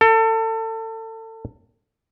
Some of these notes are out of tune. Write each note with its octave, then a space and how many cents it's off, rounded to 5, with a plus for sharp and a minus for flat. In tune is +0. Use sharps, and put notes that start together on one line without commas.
A4 +30